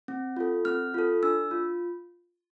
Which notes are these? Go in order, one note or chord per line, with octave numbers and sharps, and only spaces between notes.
C4
F4 A4
C4 F6
F4 A4
D4 E6
F4